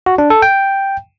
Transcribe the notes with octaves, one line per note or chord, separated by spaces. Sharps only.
F#4
D4
A4
G5